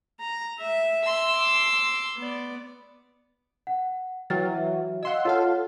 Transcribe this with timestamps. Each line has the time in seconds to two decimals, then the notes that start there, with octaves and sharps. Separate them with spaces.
0.21 A#5
0.61 E5
1.04 C6 E6
1.35 D6
2.17 B3 D5
3.67 F#5
4.30 E3 F#3 G5 F6 A6
4.54 E5
5.03 D#5 F5 F#5 C6 E6
5.25 F4 A4 C#5 F5 F#5